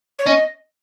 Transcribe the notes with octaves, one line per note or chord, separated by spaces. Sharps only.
C#5
C#4 D#5